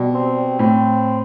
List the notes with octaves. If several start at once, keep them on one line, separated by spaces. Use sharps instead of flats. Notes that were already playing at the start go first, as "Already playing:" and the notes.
Already playing: B2 G3
C4
A2 C4